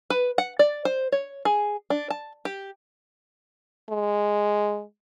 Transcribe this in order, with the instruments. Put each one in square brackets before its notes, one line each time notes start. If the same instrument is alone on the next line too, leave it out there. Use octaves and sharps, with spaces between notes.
[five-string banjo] B4
F#5
D5
C5
C#5
G#4
D4
A5
G4
[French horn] G#3